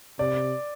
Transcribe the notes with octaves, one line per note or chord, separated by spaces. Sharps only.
C3 D5